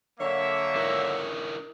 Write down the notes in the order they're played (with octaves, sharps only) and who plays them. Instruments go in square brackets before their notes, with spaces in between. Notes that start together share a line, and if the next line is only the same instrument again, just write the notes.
[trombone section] D3 [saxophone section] F#3 C#5 [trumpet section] A#3 E5
[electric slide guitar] D4 E4 A#4